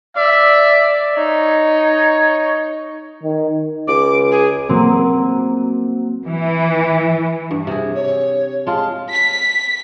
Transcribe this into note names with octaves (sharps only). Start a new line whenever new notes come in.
D5 E5
D#4 C#5
D#3
C#2 D6
G#4
F#3 A#3 C4
E3
G2
C3 G#4
C#5
G#3 F4 A5
B6